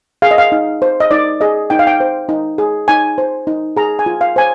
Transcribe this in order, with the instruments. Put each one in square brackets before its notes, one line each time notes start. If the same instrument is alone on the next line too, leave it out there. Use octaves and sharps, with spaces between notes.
[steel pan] G#4 F5
D#5
F5
D#4
C5
D#5
D#4 D5
G#4 D#5
D#4 G5
F5
G5
C5
D#4
G#4
D#4 G#5
C5
D#4
G#4 A#5
G#5
F4
F5
C5 G#5